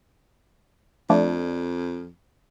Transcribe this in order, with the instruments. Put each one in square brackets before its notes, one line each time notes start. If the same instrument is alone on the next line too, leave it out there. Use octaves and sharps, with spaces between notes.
[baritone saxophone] F2 [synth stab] F3 A3 D4